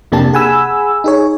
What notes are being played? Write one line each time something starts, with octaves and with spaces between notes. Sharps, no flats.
F2 C3 A#3 D4 G4 A5
G#4 F#5 G#5 B5 E6
D#4 G#4 C#5